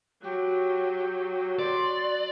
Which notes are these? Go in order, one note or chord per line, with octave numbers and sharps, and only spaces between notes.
F#3 G4
D5 C6